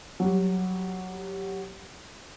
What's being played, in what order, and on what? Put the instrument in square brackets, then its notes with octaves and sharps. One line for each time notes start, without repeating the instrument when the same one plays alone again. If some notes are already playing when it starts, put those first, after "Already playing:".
[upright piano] F#3 G3